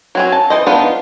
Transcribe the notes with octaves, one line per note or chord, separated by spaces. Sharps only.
F#3 C4 C#4
A5
E3 C5 D#5
F3 B3 D4 D#4 F4